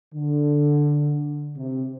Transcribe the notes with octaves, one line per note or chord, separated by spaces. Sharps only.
D3
C3